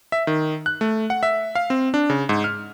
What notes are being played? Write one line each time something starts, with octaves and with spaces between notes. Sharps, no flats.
E5
D#3
F#6
A3
F#5
E5
F5
C4
D4
C#3
G#2
F6